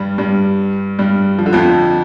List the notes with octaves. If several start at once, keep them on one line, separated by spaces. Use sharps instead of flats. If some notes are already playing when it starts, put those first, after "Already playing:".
Already playing: G2 G3
G2 G3
G2 G3
F3
D3
F2 F3